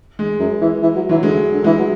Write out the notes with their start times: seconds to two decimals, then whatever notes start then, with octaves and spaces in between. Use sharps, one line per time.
0.19 G#3
0.40 F#2
0.61 E3
0.82 E3
0.95 F#3
1.09 E3 F#3
1.23 D3 G#3
1.54 D3
1.64 E3 G#3
1.79 F#3